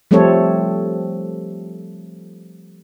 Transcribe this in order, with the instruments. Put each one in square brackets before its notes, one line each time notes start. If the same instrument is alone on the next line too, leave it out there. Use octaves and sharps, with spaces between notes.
[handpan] F3 G3 A3 C4 A4 C#5